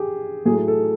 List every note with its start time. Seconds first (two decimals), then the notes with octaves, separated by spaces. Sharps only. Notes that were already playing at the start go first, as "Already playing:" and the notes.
Already playing: G4 G#4
0.45 A2 F#3 A3 G#4
0.68 A4